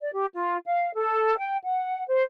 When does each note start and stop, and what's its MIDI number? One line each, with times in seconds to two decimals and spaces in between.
0.01 0.11 74
0.13 0.26 67
0.34 0.57 65
0.67 0.94 77
0.95 1.38 69
1.38 1.58 79
1.64 2.04 78
2.07 2.22 72